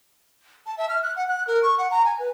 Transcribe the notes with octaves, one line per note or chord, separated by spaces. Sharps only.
A5
E5
F6
F#6
F#5
F#6
A#4
C#6
F#5
A#5
G#5
B4